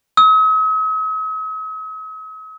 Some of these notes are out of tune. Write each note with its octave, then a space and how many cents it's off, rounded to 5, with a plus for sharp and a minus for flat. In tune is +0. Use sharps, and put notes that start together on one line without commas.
D#6 +45